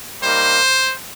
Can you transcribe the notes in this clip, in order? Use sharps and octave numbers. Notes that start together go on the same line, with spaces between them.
G3 A#3 D#4 C5